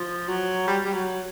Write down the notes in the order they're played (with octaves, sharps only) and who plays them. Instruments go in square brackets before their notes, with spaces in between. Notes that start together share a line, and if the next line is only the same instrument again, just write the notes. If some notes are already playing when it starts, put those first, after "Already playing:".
Already playing: [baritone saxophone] F3
F#3
G3
G3
F#3